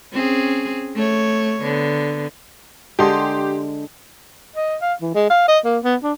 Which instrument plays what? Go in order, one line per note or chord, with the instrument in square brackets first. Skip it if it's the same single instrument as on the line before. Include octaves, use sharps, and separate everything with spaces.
[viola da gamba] C4 C#4 G#4
A3 C#5
D3 B3
[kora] D3 G#3 [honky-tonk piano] G4 C6
[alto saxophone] D#5
F5
E3
G#3
F5
D#5
A#3
B3
D4